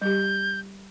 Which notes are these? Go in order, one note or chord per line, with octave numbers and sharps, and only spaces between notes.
G3 G4 G6